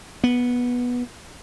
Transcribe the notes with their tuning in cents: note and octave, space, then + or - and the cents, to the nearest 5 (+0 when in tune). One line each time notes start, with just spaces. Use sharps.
B3 -10